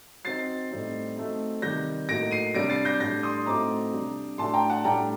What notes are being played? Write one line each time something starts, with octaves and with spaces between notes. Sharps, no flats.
F#3 C4 D#4 A6 C7
A2 G3 C4 D#4
F#3 A3 C4 D#4
C3 D#3 G3 G6 A#6
A2 F#3 A#3 D#4 A#6 D7
C7 D#7
C3 G3 D4 A#6 D7
A6 C7
G6 A#6
A2 G3 D4 G6 A#6
C6 D#6
A2 F#3 A3 C4 D#4 A#5 D6
C3 G3 D4
A2 F#3 A3 D4 A5 C6
G5 A#5
F#5 A5
A2 G3 D4 G5 A#5